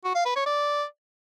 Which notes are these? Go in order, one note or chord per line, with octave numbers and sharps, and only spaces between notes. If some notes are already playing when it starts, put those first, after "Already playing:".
F#4
F5
B4
C#5
D5